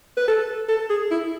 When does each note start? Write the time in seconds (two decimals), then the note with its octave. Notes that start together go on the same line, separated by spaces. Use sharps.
0.17 B4
0.28 A4
0.69 A4
0.90 G#4
1.11 E4